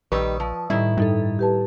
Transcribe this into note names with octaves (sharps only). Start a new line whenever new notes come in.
A#1 D#3 G3 B4 C#6 D#6 E6
F3
A2 D#3 G3 E4
G2 G3 D#4 A4
G4 B4 A5